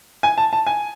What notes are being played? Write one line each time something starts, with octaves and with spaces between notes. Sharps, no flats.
G#5
A5
A5
G#5